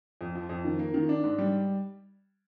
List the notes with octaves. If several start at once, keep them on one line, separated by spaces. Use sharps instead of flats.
F2
F3
F2
D#3
A#3
D#3
D4
G#2
G3